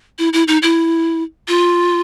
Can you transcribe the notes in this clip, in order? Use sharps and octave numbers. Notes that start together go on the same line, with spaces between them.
E4
E4
D#4
E4
F4